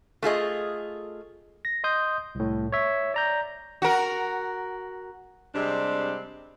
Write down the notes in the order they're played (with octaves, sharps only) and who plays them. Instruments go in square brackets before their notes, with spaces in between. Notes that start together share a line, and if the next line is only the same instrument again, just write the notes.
[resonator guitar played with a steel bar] A3 F4 G#4 D#5
[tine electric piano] A#6
D#5 C6 D#6 G6
C2 A2
C#5 E5
D5 A#5 G6
[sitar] F#4 A#4
[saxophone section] C3 G3 G#3 C4 D4